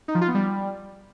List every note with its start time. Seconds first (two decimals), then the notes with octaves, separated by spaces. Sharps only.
0.08 D#4
0.15 F3
0.21 F4
0.28 B3
0.34 G3